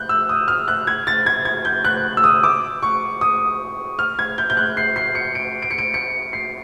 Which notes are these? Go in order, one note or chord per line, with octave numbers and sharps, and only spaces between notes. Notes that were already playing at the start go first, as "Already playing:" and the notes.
Already playing: F#6 G6
E6
D#6
F6
F#6
G#6
A6
G#6
G#6
G6
F#6
E6
D#6
D6
C#6
D#6
F6
G#6
G6
G6
F#6
C7
C7
C#7
D7
D7
C#7
D7
C#7
C7